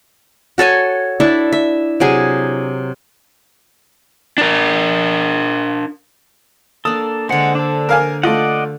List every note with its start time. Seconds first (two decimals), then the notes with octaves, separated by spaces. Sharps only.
0.58 F#4 A4 C#5 G#5
1.20 D4 E4 A4 E5
1.53 E5
2.00 C3 F#3 G#4
4.38 D4 A#4
6.85 A#3 D4 A4 D#6
7.29 D3 G#3 C5 F#5
7.55 D4 A4
7.89 A#4 F5 G#5
8.23 A3 F4 D5 D#5 F#5